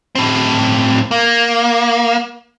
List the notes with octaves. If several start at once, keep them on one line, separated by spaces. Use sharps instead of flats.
A2 C4
A#3